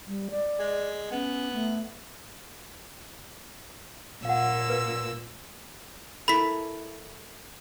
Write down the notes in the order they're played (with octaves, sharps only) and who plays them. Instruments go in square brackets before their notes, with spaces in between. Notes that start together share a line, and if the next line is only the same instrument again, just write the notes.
[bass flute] G3
D5
[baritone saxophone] G#3
[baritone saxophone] B3 [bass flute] C#4
[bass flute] A3
[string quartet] A#2 E6 [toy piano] F5 F#5
[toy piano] B4
[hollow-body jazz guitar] E4 A4 A#4 [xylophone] B5 B6